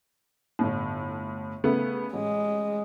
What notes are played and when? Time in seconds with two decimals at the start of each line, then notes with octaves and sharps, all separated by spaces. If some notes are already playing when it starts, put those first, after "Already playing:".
0.59 G1 A2
1.64 C#3 A3 B3
2.13 A1 G#3